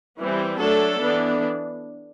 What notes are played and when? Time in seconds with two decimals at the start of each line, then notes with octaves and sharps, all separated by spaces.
0.18 E3 G3 C4
0.59 F#3 A3 D4 A4
1.01 E3 B3 D4